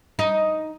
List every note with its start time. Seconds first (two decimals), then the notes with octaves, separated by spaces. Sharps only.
0.19 D#4